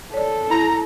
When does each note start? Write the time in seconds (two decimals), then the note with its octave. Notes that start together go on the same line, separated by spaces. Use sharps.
0.14 A4 C#5 D5
0.50 E4 A#5